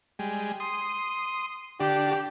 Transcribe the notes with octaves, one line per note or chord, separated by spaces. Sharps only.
G3 G#3
C6 D#6
D3 D4 G4